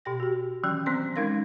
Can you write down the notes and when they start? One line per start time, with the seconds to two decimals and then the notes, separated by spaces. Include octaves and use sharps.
0.05 B2 G4 G5 A#6
0.20 F#4 G4
0.63 D#3 E3 F#3 C#4 G5 G6
0.86 F#3 B3 C4 C5 C6
1.16 G#3 C#4 D#4 A#4 F5 A#6